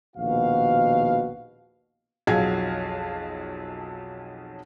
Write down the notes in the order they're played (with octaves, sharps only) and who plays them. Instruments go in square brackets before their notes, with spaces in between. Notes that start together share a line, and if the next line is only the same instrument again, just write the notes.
[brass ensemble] A#1 D#2 B2 F#4 F5
[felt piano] B1 F2 F#3 G#4 F5 G#6